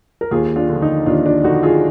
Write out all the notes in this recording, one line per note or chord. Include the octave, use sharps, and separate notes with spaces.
A#4
D#2 F4 G#4
D4 F4
D3 F3
D#4
D#2 D4 F4
D4 F4
D3 F3 D#4 F#4
F4 G#4